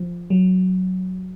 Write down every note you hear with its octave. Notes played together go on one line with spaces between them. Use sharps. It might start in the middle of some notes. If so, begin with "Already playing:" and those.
Already playing: F3
F#3